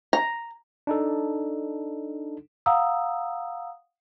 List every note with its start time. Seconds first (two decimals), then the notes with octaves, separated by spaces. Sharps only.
0.13 A#5
0.87 D4 D#4 A4
2.66 F5 F#5 A#5 D#6 E6